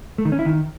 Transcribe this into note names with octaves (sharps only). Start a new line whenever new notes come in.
A3
D#3
C#4
E4
D#3